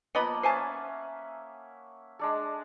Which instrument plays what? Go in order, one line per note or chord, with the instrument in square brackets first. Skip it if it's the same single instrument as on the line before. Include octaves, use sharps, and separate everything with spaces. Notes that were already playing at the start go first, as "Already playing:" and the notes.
[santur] F3 A#3 F#5 [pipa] B3 D#5 B5
[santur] C#4 E5 D#6 [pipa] C5 G#5 A5
[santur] G#3 D4 A4